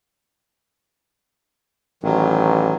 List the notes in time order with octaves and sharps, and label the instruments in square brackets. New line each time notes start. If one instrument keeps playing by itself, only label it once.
[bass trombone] A1 [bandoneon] D#3 F#3